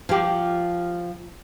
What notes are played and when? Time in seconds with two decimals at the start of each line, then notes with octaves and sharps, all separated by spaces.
0.09 F3 G4